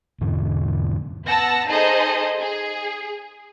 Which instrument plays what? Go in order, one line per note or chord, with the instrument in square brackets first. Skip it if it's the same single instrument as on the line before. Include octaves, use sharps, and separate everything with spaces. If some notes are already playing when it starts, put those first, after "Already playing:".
[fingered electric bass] E2 G#2 D3 E3
[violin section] B3 F#5 A5 E6 A#6
D#4 G#4 A4 C5 D#5
G#4